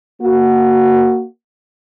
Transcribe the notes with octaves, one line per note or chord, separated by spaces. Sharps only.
A#3 F#4